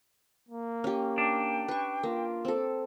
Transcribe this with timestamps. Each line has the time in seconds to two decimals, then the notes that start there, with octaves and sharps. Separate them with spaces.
0.49 A#3
0.84 C#4 G4
1.18 D4 G5
1.68 B4 C#6
2.03 A#3 F4
2.45 C4 A4